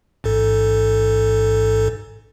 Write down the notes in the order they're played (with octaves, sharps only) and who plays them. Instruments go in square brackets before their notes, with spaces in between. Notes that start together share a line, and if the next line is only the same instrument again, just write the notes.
[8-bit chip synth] A1 G#2 A4